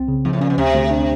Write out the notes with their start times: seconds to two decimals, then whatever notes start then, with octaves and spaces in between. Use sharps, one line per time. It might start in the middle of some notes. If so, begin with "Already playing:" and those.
Already playing: C2 C4
0.08 C#3
0.25 G#2 F3
0.33 A2
0.41 A#2 C#4
0.50 B2
0.58 D2 C3
0.74 D2
0.91 D4